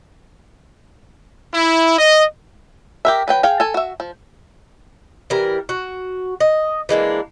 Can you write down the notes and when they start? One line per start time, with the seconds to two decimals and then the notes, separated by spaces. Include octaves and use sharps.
1.54 E4
1.98 D#5
3.05 G4 A#4 E5
3.28 F#3 B4 G5
3.43 G#4 F5 G5
3.60 A4 G#5
3.74 F#4 E5
4.00 F3
5.30 E3 G3 A#4
5.69 F#4
6.41 D#5
6.89 E3 G#3 A#3 D4